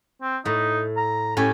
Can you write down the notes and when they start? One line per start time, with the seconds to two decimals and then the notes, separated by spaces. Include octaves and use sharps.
0.22 C4
0.45 A2 D#4
0.97 A#5
1.37 A2 C#4 G4 G#5